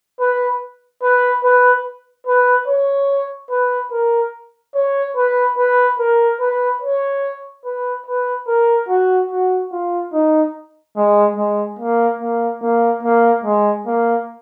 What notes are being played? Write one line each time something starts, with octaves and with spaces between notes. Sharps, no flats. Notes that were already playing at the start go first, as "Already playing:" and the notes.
B4
B4
B4
B4
C#5
B4
A#4
C#5
B4
B4
A#4
B4
C#5
B4
B4
A#4
F#4
F#4
F4
D#4
G#3
G#3
A#3
A#3
A#3
A#3
G#3
A#3